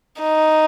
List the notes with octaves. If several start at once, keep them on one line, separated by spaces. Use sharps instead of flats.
D#4